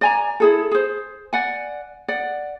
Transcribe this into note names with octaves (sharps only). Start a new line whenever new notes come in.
D5 G#5 A#5
E4 G#4 A4
G#4 C5
D5 F#5 G#5
D5 F#5